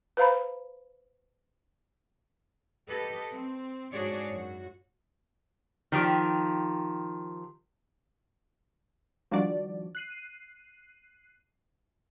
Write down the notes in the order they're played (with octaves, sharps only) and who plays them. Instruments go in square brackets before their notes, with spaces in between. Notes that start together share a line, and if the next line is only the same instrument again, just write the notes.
[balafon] B4 C5 F5 A#5 B5
[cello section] G4 A4 B4 D#5
C4
G#2 D4 F#4 G#4 C#5 D5
F#2 F#4
[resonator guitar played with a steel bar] D#3 F3 G4
[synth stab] D#3 F3 G3 D4 F#4 D5
F#6 C7 D#7